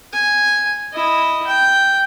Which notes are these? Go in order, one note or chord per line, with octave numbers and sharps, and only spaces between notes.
G#5
E4 D#5
G5